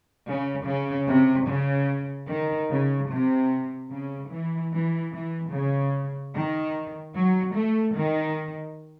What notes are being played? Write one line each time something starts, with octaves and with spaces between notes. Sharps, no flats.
C#3
C#3
C3
C#3
D#3
C#3
C3
C#3
E3
E3
E3
C#3
D#3
F#3
A3
D#3